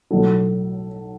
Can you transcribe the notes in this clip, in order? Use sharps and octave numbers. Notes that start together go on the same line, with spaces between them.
B1 A2 F#3 A4